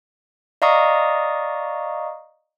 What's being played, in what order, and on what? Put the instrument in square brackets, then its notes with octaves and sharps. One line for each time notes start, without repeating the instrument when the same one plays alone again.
[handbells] D5 D#5 F5 A#5 C#6 D#6